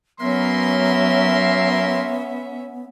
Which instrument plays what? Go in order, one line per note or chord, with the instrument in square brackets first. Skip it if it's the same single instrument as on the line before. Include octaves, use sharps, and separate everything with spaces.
[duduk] F#3 [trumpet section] A#3 A#4 C6 [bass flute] B3 [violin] C#4 E5